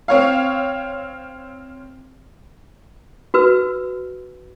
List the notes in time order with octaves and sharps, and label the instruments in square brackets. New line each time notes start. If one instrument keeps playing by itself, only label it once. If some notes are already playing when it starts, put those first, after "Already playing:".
[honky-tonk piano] C4 C#5 F5
[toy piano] F#4 B4 E6